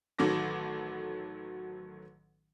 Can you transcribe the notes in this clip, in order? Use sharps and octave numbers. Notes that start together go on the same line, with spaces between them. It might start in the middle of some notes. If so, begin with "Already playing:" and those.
A1 D#3 F#3 A4 D6 A#6